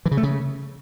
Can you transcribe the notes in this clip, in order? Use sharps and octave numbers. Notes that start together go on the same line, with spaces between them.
E3
C#3
A3
C#3